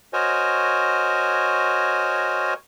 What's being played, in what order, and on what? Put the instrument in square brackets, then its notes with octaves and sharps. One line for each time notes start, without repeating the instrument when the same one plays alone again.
[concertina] F#4 A#4 C5 C#5 D#5 G#5